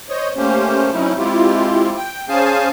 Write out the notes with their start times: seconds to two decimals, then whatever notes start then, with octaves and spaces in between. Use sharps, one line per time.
0.09 C5 C#5 D#5
0.37 A3 A#3 C#4 G4 C5
0.93 F#3 A3 C4 C#4 D#4 E4
1.18 G#3 C4 E4 F4 G4
1.97 G5
2.29 C#4 G#4 C5 F5 G#5 A5